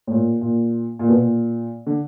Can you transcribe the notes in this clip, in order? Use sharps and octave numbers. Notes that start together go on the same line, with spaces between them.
A2
A#2
A#2
A#2
B2
A#2
D3